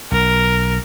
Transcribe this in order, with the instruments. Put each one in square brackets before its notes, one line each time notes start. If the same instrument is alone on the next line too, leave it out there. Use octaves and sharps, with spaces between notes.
[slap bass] B1 [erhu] A#4